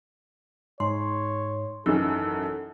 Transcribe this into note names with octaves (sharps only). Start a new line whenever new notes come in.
G#2 C#5 C6
G#1 F#2 E3 D#4 A4